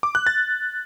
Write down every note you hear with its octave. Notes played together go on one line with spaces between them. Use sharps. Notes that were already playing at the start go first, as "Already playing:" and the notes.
D6
F#6
A6